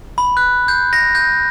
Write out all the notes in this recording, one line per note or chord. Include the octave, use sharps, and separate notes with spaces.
B5
F#6
G6
A#6
G6